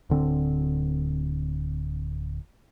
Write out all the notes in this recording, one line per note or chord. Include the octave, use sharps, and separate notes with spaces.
D1 D3 C4